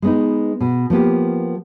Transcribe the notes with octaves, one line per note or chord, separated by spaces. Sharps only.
G#3 B3 D#4
B2
F3 A#3 B3 G4